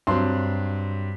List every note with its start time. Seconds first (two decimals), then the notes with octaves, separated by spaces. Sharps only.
0.07 G2 F#3 C4 C6